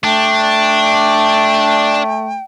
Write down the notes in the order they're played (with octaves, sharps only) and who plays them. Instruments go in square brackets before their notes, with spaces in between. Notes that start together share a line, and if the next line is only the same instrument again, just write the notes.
[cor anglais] A3 [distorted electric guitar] D4 [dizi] G5